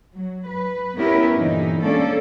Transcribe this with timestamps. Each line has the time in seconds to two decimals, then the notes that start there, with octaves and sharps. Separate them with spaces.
0.15 F#3
0.48 B4
0.97 B3 C#4 E4 G4 A#4 B4
1.35 G2 A#2 D3 E3 D#4
1.83 G#3 A#3 C#4 D4 A4 D5